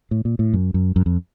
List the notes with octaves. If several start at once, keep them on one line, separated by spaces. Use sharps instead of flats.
A2
A#2
A2
F#2
F#2
F#2
F2